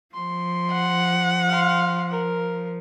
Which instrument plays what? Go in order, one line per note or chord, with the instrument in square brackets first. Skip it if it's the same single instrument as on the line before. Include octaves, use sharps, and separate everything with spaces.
[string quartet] F3 [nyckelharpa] C6
[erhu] F#5
[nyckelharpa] F5 C6
A#4